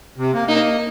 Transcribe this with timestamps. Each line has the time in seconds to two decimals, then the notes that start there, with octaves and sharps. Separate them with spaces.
0.17 C3
0.33 A#3
0.48 A#3 D#4